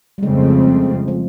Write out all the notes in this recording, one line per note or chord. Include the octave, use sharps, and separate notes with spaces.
G3
F2 C#3 F3 G#3 A3 C4
F3